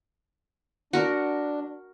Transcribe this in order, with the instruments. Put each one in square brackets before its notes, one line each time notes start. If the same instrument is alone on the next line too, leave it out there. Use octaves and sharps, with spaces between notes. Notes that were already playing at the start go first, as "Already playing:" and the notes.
[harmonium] D4 [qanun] F#4 A#4